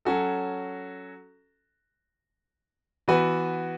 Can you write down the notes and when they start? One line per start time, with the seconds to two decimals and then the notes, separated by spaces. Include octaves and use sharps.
0.05 F#3 C#4 F#4 A4
3.08 E3 B3 F#4 B4